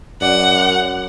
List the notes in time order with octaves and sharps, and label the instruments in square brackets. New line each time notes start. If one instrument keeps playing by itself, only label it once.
[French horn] F#2 [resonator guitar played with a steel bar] D5 [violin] F#5